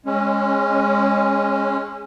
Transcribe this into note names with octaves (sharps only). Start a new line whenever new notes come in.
G#3 C#4